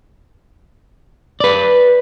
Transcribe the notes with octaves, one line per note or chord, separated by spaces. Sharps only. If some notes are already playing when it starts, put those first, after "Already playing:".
B4 D5